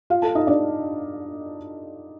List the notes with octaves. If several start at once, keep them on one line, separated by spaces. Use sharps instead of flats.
F4 F5
A4 A5
D#4 D#5
D4 D5